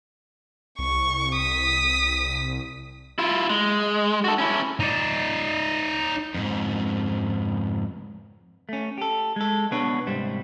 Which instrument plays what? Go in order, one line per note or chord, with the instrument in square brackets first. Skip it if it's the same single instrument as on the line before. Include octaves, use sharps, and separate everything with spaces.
[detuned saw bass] C2 [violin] C#6
[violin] D#6 B6
[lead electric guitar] E4 F4
G#3
F#4 A4
C#4 E4
[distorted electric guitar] D#4 D5
[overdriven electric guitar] F2 G#2
[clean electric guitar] A3 C#4
G4 A4
G#3 A4
B2 B3 D4 B4 C#5
C2 G#2 G3 C5